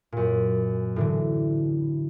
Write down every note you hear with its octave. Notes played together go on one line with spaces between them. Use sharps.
F#2 A#2
A2 D3 E3